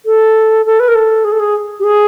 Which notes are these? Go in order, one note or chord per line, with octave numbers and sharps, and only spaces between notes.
A4
A4
B4
A#4
A4
G#4
A4
G#4
G4
G#4